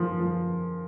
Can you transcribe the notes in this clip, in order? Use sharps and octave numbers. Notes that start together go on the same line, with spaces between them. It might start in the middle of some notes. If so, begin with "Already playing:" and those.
Already playing: F3 A#3
F3